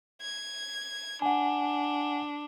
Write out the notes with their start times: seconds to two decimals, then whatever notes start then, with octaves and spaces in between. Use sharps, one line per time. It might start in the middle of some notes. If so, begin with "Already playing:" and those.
0.22 G#6
1.22 D4 F#5 G#5